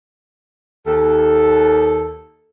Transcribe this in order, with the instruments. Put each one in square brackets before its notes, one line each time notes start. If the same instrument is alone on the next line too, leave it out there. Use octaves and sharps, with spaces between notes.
[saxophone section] D#2 A4